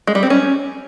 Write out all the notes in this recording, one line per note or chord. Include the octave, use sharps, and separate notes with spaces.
G#3
G3
C4
C#4